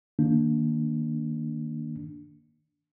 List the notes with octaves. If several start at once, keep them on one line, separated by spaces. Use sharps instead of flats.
D#3 A#3 D4